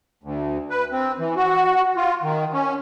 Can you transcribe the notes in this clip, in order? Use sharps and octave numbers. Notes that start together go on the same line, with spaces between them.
D2
B4
C4
E3
F#4
F4
D#3
C#4